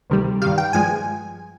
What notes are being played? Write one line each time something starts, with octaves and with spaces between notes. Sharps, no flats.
D2 C3 D#3 G3
G2 D#3 G3 F5
G5
G2 F3 G#3 G#5